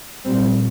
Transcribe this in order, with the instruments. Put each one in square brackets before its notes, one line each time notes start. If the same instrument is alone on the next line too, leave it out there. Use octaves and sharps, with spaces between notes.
[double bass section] A#1 A#2 G3 C4